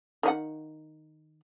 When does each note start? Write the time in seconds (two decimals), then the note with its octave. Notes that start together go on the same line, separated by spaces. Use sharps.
0.23 D#3 D#4 F#5